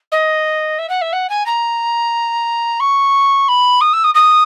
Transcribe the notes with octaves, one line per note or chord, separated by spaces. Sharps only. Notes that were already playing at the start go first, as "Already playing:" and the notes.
D#5
E5
F#5
E5
F#5
G#5
A#5
C#6
B5
D#6
E6
D#6
D#6